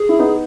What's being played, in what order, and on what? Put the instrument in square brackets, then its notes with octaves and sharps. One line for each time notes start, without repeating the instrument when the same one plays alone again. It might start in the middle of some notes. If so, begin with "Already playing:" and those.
Already playing: [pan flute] G#4
[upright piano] E4
B3 D#4